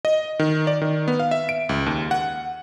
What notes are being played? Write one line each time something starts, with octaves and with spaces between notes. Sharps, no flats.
D#5
D#3
D5
D#3
B3
F5
E5
D7
C#2
D#2
F#5